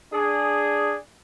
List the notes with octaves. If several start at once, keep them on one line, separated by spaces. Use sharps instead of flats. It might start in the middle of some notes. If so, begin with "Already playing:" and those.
D4 G#4